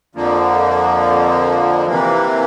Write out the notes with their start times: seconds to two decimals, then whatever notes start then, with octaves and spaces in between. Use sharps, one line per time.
0.15 F2 D3 F3 A#3
1.86 C3 E3 A#3